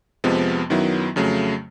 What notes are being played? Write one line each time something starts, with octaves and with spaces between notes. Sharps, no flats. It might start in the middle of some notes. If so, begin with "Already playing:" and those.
F2 C3 F3 G#3 B3
F#2 D#3 F#3 B3 E4
F2 C#3 F#3 A3